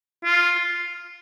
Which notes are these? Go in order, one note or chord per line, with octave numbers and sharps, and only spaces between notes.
F4